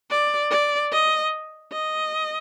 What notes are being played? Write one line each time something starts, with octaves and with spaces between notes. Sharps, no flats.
D5
D5
D#5
D#5